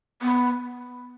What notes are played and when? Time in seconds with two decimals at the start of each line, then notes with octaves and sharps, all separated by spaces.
0.22 B3